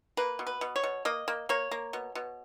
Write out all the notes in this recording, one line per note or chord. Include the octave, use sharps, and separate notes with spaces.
A#3 B4
B2
B4
B2
C#5
B2
A#3 D#5
A#3
A#3 C#5
A#3
B2
B2